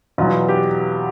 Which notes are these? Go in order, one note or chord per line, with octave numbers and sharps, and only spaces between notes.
E2 B2 F#3 F4
G4